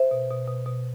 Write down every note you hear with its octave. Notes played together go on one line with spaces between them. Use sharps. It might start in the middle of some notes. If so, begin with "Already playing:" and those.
Already playing: C5 E5
B2
B2
B2
B2